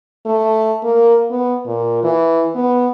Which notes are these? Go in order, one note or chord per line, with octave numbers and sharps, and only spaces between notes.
A3
A#3
B3
A#2
E3
B3